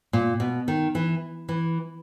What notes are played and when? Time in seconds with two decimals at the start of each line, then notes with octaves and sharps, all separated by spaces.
0.13 A#2
0.40 B2
0.68 D#3
0.95 E3
1.49 E3